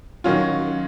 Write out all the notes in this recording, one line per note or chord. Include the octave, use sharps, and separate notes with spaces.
D#3 F#3 C#4 F4